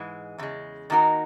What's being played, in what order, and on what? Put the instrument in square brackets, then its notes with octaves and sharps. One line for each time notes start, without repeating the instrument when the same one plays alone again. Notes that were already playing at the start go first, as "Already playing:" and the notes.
Already playing: [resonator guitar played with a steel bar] G#2 E3 G#3
E2 C#3 G#3
D#3 A#3 D#4 F#4 A#4